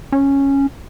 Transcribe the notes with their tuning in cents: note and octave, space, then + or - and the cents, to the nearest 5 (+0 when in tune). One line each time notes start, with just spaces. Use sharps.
C#4 -5